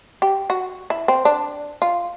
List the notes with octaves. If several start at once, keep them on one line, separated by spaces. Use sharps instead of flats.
G4
F#4
E4
C4
D4
F4